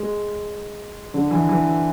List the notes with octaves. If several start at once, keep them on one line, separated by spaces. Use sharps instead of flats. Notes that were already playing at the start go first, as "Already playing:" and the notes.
Already playing: G#3
D3
E3
E3